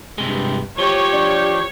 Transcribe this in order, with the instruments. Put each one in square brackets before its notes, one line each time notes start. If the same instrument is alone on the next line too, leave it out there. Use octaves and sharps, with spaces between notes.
[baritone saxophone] G2 [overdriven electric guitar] C3 G#3
[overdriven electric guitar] F3 [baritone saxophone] G4 [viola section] C#5
[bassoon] D4